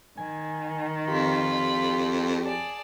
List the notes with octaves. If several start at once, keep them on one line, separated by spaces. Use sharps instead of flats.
D#3 G#5
F2 F4 G4 B5
G#4 D5 A5